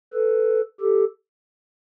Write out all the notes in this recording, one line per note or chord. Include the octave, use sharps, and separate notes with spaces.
A4 B4
G4 A4